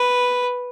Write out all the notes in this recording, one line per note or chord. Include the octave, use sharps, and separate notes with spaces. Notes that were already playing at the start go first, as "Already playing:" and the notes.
Already playing: B4